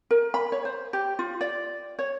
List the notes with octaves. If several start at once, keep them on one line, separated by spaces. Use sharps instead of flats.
A#4
B5
C#5
C5
G4
F4
D5
C#5